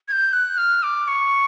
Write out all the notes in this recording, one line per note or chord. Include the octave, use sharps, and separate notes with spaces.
G#6
G6
F#6
F6
D6
C#6